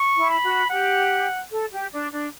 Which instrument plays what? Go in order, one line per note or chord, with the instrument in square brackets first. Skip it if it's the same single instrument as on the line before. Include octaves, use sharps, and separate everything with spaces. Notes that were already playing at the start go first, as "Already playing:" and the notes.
Already playing: [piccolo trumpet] C#6
[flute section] E4
[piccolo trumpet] B5
[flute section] F#4
[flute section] G4 [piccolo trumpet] F#5
[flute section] A4
G4
D4
D4